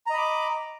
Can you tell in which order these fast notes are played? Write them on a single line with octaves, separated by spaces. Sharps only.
A#5 D#5 B5 D6